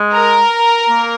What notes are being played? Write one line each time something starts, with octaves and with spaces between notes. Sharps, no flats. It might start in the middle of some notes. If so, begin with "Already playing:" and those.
Already playing: G#3
A#4
A#3